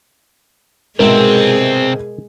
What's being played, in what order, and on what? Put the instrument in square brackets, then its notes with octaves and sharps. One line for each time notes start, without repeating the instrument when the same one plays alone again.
[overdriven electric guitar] C2 C4 [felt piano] G#2 B2 E5 [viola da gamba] G#3 G#4 [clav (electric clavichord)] A#4